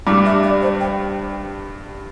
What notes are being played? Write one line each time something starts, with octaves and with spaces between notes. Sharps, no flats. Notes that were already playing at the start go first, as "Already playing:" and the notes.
G2 G3 D6
E5
D5
C5
G5